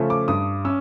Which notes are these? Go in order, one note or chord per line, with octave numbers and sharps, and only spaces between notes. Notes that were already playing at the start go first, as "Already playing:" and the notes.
Already playing: C#3 F3 A3 C#4
D6
G2 D#6
C#4 E6